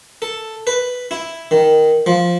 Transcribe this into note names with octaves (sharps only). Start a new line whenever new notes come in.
A4
B4
E4
D#3
F3